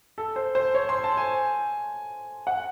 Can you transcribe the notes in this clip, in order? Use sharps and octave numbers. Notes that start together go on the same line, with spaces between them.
A4
C5
C5
C#5
C6
A5
G#5
F#5